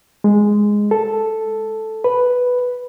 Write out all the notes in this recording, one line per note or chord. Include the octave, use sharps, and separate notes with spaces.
G#3
A4
B4